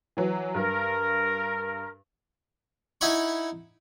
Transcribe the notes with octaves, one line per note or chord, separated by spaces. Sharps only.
E3 F#3
G2 A#4
D#4 E4 F#5 G#5 B5 C#6